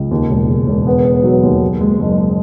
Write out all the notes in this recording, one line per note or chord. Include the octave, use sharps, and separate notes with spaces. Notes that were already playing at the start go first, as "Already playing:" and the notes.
Already playing: C#2
D#2
E1
E1
E1
B3
B3
F#3
D#2
F#1
G#3
F#1